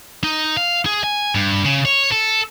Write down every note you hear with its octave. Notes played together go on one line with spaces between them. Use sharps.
D#4
F5
G#4
G#5
G2
C#3
C#5
A4